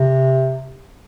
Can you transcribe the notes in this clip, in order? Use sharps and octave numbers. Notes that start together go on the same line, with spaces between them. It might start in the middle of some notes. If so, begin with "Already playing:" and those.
Already playing: C3